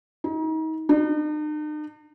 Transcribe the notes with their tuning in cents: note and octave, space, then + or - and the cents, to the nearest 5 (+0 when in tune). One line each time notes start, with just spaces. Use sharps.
D#4 +35
D#4 -45